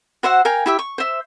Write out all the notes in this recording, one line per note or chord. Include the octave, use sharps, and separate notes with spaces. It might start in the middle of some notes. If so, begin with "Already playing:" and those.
F#4 C5 E5 F#5
A#4 F5 G5 G#5
E4 G4 E5
C#6
C5 E5